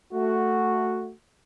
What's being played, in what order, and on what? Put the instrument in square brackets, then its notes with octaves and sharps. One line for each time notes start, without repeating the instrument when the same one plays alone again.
[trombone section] A3 F#4